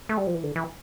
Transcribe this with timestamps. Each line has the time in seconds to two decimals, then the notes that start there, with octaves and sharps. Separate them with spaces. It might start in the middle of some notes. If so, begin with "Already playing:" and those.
0.09 A3
0.17 G3
0.27 F3
0.35 E3
0.43 D3
0.56 E3